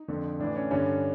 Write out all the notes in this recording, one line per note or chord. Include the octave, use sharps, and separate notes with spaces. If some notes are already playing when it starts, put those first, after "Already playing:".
Already playing: D#4
F2 D3
A2 E3 D4
C#4
G2 D3 C#4